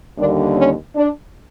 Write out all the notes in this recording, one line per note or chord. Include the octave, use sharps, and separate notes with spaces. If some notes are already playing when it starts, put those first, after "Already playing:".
D#2 D3 G3 A#3 D4
C#4
D4